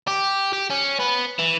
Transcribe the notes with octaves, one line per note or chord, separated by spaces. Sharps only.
G4
G4
C#4
B3
E3